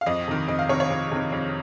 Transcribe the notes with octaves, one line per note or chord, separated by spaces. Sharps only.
F5
F2 D#5
C3 D#3
F2 D#5
F5
C3 D#3 C#5
C#5
F2
C3 D#3
F2